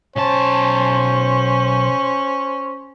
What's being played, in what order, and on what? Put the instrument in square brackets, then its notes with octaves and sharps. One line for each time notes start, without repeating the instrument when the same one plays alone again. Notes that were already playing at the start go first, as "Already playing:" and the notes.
[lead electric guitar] B1 A5 [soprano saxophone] C#4 [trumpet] C5